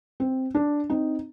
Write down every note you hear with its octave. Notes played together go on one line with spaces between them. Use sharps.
C4
D4
C4 D#4